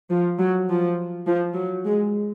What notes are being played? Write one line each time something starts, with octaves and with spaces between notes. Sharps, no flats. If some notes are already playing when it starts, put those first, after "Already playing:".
F3
F#3
F3
F3
F#3
G#3